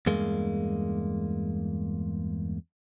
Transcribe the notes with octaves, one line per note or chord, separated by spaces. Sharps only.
E2 G2 G#3 A#3